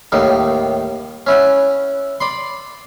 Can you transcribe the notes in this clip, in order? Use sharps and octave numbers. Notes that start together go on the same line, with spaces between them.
D#2 A2 G3 D#4
C#4 E4 F#5
D5 B5 C6